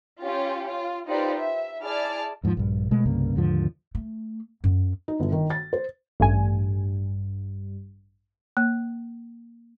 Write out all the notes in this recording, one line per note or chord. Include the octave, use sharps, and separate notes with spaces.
C#4 F4 G4
F4
D#4 F4 G4 B4 C5 D5
E5
E4 G#4 D5 A5 F6
E2 G#2 D#3 F3
A#1 G2
B2 G#3 A3
C2 G2 C#3 A#3
D#2 G#2 D3 F3
A3
F#2
D#4
G1
D#3
A6
C5
A1 G2 A3 G#5
A#3